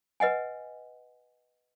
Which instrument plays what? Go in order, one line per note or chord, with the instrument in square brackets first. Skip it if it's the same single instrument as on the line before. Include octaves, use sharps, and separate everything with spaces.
[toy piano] B4 D#5 F#5 G#5